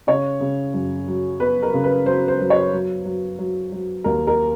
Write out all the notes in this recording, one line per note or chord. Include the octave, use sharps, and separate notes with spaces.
C#3 C#5
C#3
F#2
F#3
B3 B4
A#4
C#3
B4
F#3 C5
C5
F#3
C#5
F#3
F#3
F#3
F#3
D#2 A#4
A#4